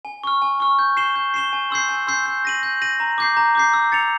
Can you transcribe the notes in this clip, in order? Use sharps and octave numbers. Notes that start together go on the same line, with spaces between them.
G#5
C#6 F6
G#5
C#6 F6
G6
C7 E7 G7
G6
C7 E7 G7
G#5
C6 E6 G6 C7
G#5
C6 E6 G6 C7
G6
A#6 D#7 F#7
G6
A#6 D#7 F#7
A#5
D6 G6 C7
A#5
D6 G6 C7
E6
A6 C#7 F7